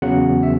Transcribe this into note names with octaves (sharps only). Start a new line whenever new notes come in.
E2 C#3 F#3 F#5
E5